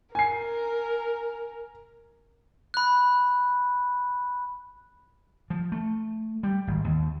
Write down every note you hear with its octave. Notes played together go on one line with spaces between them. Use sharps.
A#4 G#5 C7
B5 F#6
F3
A3
G3
G#1
D#2